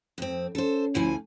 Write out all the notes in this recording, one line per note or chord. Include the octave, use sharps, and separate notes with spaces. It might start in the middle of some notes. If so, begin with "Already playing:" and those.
F2 C4
C#4 A4 C5
D2 F3 E4 G#5